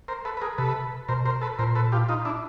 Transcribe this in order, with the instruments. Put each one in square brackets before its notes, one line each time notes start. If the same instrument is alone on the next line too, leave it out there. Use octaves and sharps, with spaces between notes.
[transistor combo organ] A#4 C5
A4 B4
B4
G#4 A#4
[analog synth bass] C3 [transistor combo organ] A4 B4
[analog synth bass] B2 [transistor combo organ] A#4 C5
[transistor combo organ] A#4 C5
A4 B4
[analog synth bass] A#2 [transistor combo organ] A#4 C5
[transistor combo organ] A4 B4
F4 G4
D#4 F4
D4 E4